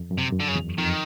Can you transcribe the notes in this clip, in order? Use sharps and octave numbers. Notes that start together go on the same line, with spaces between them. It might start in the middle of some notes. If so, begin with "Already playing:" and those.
Already playing: F2
F#2
C3
F#2
D3
C#3
E2
F2 D#3